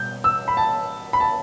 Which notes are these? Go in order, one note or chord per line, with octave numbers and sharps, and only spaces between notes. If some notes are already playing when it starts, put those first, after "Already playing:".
Already playing: B2 G3 G6
E6
B5
A5
B5
A5